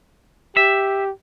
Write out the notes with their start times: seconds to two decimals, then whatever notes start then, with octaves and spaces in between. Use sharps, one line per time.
0.57 G4 E5